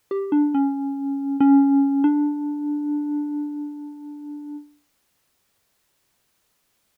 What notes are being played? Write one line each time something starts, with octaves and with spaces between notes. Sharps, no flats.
G4
D4
C#4
C#4
D4